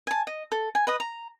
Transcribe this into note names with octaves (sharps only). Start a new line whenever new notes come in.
G#5 A5
D#5
A4
G#5
B4 D#5 D#6
A#5